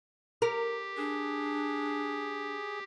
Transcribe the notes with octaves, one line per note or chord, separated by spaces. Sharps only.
G4 A#4
D4 G#4